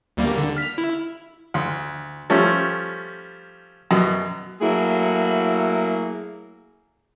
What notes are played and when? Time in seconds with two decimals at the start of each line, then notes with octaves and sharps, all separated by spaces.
0.17 D2 G3 A#3
0.38 D3
0.57 F6 B6
0.78 E4
1.54 D2
2.30 F3 G3 A3 C#4
3.91 F#2 B2
4.62 F#3 A3 A#3 E4 G#4